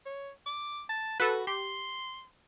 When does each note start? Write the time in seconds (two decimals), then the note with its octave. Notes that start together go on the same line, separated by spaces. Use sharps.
0.06 C#5
0.46 D6
0.89 A5
1.20 F#4 A4 B4
1.47 G4 C6